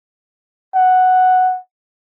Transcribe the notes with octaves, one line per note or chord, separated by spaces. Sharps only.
F#5